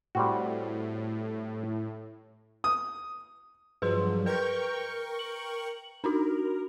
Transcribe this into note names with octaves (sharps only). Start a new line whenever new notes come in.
A2 G3 C4 F#4
D#6
G2 F3 F#3 G#4 B4 C6
A#4 B4 G5 C#6 G6
F#7
D4 D#4 F#4 A#4